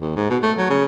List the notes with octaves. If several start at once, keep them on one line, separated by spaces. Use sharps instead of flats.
D#2
G#2
B2
A3
F#3
C#3